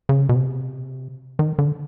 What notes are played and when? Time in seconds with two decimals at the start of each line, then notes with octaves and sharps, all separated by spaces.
0.09 C#3
0.29 B2
0.35 C3
1.39 D#3
1.58 D3